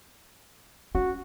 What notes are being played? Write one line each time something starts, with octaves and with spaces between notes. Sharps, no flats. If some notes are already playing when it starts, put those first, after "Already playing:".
C#4 F#4